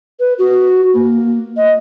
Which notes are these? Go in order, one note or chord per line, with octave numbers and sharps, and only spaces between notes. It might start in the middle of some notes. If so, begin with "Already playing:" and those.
B4
F#4
A#3
D#5